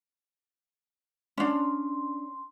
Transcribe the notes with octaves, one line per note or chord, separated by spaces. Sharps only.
C#4 D4 C6